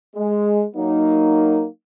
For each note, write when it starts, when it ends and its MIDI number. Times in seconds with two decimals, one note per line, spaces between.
0.16 0.64 56
0.76 1.66 54
0.76 1.66 58
0.76 1.66 63